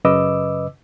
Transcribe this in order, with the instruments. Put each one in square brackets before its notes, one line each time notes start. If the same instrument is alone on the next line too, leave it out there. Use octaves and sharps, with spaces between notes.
[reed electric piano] F#2 C#3 B4 D#5 D6 E6